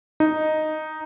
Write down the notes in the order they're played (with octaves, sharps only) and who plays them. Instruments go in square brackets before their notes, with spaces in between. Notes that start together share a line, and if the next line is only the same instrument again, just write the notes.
[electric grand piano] D#4